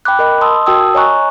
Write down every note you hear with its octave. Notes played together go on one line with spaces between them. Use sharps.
G5 B5 D6 F#6
A#4 D#5 B5
D#5 A5 C6 D#6 E6
F#4 A#4 G5 A5 D#6 E6
C#5 D#5 G#5 A#5 C#6 F#6